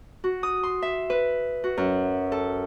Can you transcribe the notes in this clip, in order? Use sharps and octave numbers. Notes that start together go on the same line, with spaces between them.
F#4
D#6
C6
E5
B4
F#4
F#2
A4